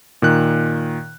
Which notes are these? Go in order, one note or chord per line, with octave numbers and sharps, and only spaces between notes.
A#2 D#3 F#6